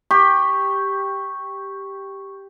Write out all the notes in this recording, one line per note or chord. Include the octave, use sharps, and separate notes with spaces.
G4 C#6